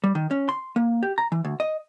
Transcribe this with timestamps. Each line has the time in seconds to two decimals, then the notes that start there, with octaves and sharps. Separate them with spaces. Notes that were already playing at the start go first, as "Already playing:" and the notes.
0.04 G3
0.15 D#3
0.31 C#4
0.49 C6
0.76 A#3
1.03 G4
1.18 A#5
1.32 E3
1.45 D2
1.60 D#5